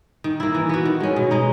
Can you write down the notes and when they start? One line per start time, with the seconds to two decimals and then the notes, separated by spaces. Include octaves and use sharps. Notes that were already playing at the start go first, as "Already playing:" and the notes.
0.24 D#3
0.40 A#3 E4
0.55 E3
0.69 B3 F#4
0.86 D#3
1.00 G#3 C#4
1.16 B2
1.31 G#3 D#4